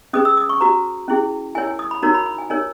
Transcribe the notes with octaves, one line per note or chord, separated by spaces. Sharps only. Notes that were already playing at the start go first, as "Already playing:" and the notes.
C#4 G#4 B4 D#6
E6
D#6
C#6
F#4 B4 A#5
C#4 E4 G#4
E4 A#4 C#5 G#5
G#5
D#6
B5
D#4 F#4 A#4 C#5 A#5
B5
B5
G#5
D#4 A#4 C#5 G#5